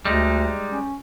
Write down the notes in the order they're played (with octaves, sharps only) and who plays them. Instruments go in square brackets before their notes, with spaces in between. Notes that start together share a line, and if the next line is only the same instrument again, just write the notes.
[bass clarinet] D2 [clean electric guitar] G3 G#3 D#4
[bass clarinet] C#4